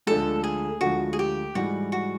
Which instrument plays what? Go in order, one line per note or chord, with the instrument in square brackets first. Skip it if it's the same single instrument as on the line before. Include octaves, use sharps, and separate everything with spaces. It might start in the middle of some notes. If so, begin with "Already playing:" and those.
[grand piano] D2 D3 F3 G#3 [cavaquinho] A4
[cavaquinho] G#4
[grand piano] D2 D3 F3 G#3 [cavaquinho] F#4
[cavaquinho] G#4
G4
[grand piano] G#2 E3 G3 [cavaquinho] F#4
[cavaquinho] F#4